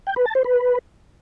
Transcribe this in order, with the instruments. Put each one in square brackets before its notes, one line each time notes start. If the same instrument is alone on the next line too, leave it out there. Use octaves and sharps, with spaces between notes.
[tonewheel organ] G5
B4
A5
C5
B4